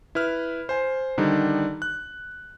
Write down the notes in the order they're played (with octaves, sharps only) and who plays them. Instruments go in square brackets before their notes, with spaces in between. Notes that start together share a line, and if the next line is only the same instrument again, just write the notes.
[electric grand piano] E4 B4 F6
C5 G#5
D3 D#3 G3 D#4
F#6